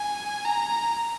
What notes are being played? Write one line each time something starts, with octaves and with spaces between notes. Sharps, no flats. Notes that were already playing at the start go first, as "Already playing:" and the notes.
Already playing: G#5
A#5